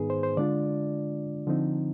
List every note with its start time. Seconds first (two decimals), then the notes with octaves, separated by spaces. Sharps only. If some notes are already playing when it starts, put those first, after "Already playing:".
Already playing: G#2 D#3 B3 D#4 G#4 B4
0.10 C5
0.23 C5
0.37 D3 G#3 D4 F4 D5
1.47 D3 F3 C4 D#4